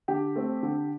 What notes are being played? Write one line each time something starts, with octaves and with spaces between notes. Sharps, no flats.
D3 G4
A3 C4
D3